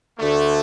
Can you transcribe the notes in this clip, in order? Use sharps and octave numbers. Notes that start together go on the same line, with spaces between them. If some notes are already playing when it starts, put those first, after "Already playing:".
D2 D3 A3